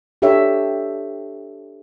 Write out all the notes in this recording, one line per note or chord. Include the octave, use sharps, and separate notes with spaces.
D4 G4 A4 C#5 E5